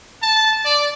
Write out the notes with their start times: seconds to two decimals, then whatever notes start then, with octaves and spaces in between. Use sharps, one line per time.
0.22 A5
0.65 D5